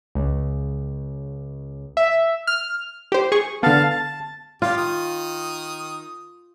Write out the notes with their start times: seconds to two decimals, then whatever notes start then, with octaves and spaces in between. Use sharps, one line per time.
0.15 C#2
1.97 E5
2.47 F6
3.12 G4 C5
3.32 G#4 C#6
3.63 D3 B3 F5 A5
3.90 A5
4.62 F4 G4
4.77 D#3 D#6